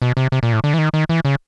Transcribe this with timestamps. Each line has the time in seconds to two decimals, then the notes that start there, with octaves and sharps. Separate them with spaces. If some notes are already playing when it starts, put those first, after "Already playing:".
0.02 B2
0.17 C3
0.32 C3
0.43 A#2
0.53 A2
0.64 D3
0.74 E3
0.78 D#3
0.94 D#3
1.09 E3
1.25 C#3